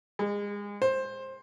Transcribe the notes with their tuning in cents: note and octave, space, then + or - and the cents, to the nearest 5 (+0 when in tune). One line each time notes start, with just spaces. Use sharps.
G#3 -30
C5 +15